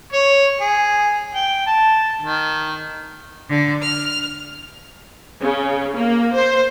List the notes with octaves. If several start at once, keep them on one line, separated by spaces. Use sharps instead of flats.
C#5
G#4
G5
A5
D#3
D3
F6
C#3
A#3
C5